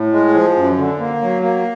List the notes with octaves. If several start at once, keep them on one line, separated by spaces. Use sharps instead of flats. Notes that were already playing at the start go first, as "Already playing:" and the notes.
Already playing: A2
G#3
F3
F#2
D3
A#3
F#3
A#3